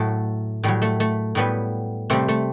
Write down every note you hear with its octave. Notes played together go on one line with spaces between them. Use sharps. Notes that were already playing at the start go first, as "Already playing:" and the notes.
Already playing: A2 F#3 A3
A2 F#3 G3
A3
A3
A2 F#3 G3 B3
C3 G3 A3 C4
A3